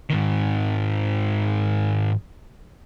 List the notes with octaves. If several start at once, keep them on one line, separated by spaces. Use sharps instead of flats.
G#2 D#3